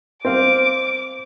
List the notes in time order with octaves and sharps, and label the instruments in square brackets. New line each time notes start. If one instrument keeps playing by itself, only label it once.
[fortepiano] C4 F5 [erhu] D6